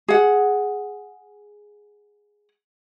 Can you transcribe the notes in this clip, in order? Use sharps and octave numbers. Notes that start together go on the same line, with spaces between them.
G#4 F#5